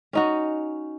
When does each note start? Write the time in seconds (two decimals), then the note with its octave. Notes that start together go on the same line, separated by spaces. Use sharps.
0.13 C#4 D#4 F#4